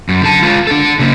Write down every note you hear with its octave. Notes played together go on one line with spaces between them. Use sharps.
F#2
D3 A5
G#3 F4
D4 A4
C#3 A#3